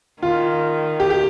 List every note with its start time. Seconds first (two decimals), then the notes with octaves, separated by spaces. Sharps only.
0.22 D#3 F4
1.00 G4
1.10 G4